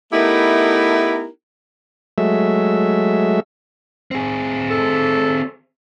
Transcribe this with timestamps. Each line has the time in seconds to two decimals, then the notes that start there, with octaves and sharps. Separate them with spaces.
0.13 A3 B3 D#4 E4 G4 A#4
2.18 F#3 G#3 A3 E5
4.11 C4 G#4
4.71 A4